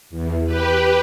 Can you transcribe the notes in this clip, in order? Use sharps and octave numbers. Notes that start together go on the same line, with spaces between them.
E2
G4 B4